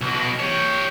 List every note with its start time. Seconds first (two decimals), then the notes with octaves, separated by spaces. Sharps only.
0.01 B1 B2
0.40 G4 C#5